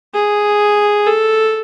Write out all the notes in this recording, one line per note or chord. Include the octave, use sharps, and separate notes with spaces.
G#4
A4